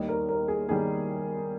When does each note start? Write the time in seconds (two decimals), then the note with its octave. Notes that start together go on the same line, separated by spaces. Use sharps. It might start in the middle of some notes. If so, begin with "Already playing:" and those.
Already playing: D#2 D#3 G3 D#5
0.09 A#4
0.29 A#4
0.48 G#4
0.69 D#3 G3 G#4